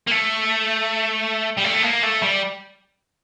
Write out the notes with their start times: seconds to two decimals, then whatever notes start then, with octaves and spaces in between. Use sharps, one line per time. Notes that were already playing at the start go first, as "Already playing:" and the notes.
0.07 A#3
0.11 A3
1.58 G3
1.65 A3
1.84 A#3
2.04 A3
2.22 G3